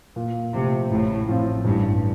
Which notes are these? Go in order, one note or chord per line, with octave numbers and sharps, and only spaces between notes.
A#2
C3 F3 A3
A1 A2
A2 F3 C4 F4
A1 G2